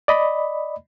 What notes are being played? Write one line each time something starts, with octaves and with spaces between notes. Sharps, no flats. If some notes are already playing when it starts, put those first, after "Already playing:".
D5 D#5 B5